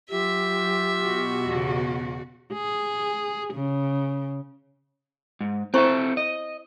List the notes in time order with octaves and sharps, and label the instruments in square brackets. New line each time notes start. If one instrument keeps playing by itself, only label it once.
[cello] F#3 [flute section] F4 G4 [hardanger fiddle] E5
[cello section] B2 F#4
[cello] E2 C#3
[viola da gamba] G#4
C#3
[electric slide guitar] G#2
[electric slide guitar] C4 A4 E5 [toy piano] E4 C5 C#6
[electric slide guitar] D#5